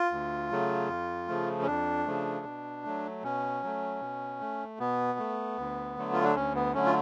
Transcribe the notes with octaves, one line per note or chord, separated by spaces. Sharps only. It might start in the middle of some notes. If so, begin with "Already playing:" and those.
Already playing: F4
D2
C#3 F#3 A3
F2
C#3 F3 A3
C#4
F2 D4
C#3 F3 A3
B2
F#3 A3
B2 C#4
F#3 A3
B2
A3
B2 B3
A3
D2
D3 F#3 A3
F4
D4
D2 C#4
B3
D3 F#3 A3 C#4
F4